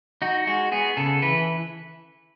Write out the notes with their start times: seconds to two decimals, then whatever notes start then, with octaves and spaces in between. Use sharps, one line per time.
0.22 D#4 F#4
0.47 G#3 F#4
0.72 B3 G#4
0.97 C#3 A4
1.22 E3 B4